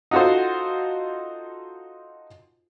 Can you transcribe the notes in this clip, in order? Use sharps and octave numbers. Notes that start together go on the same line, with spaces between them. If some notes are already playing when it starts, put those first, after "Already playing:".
D#4 F4 F#4 A4 C5